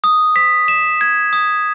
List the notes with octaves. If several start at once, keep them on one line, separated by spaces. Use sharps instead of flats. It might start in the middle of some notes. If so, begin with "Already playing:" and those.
D#6
B6
E7
G#6
D#6